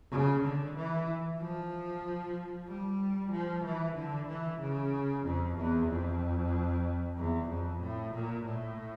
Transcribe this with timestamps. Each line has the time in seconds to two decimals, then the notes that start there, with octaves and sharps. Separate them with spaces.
0.11 C#3
0.42 D3
0.76 E3
1.39 F3
2.68 G3
3.32 F3
3.64 E3
3.95 D3
4.27 E3
4.60 C#3
5.24 F2
5.56 E2
5.88 F2
7.17 E2
7.49 F2
7.81 A2
8.14 A#2
8.45 A2